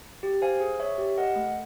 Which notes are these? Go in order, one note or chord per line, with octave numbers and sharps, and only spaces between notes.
G4
C5 F5 G#5
G#4
C#5 E5
G4
A#4 D#5 F#5
A3